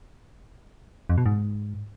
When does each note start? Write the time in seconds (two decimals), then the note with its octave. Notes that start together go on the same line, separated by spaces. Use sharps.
1.09 F2
1.18 B2
1.26 G#2